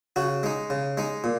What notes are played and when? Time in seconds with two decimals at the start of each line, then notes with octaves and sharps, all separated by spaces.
0.16 C#3 F#4
0.43 G#3 D#4
0.70 C#3
0.97 G#3 D#4
1.24 A#2